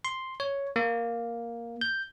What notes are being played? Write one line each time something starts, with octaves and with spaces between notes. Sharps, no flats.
C6
C#5
A#3
G6